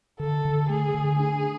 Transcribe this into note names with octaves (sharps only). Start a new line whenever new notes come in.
D3 A4
D3
A3 G#4
D3
D4 G#4